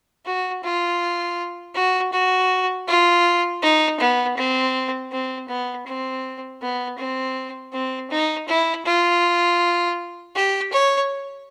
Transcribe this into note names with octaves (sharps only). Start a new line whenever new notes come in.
F#4
F4
F#4
F#4
F4
D#4
B3
C4
C4
B3
C4
B3
C4
C4
D#4
E4
F4
G4
C#5